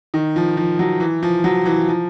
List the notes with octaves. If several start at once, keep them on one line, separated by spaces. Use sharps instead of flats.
D#3
F3
F3
F#3
E3
F3
F#3
E3
F3